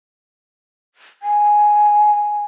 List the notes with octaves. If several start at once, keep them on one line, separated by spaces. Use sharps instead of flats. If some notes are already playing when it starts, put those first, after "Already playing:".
G#5